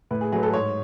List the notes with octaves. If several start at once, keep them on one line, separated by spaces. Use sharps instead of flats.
A2 B4
G#4
F#3 A3 G#4
B4
A4
G#2 C#5